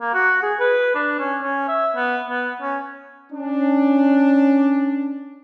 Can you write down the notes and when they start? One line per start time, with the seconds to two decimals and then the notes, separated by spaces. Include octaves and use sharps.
0.01 A#3
0.14 F#4
0.43 G#4
0.60 B4
0.95 D4
1.19 C#4
1.42 C#4
1.68 E5
1.96 B3
2.29 B3
2.62 C#4
3.33 C#4 D4